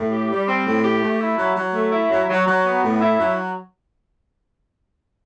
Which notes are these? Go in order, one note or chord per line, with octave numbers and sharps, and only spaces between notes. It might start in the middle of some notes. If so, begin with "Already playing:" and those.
Already playing: A2
G4
G3
C4
A2
G4
A3
E4
F#3
F#3
A3
E4
F#3
F#3
F#3
B3
A2
E4
F#3